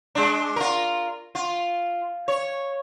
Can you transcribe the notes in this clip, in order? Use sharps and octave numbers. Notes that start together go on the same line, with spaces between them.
G#3 D4
F4 A#4
F4
C#5